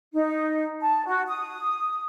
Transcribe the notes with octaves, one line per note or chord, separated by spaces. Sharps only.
D#4
A5
F#4
D#6